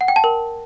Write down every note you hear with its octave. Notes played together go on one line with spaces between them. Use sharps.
F#5
G5
A5
A#4